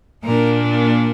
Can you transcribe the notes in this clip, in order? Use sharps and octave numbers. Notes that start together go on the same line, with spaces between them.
A#2 A#3 D4 A#4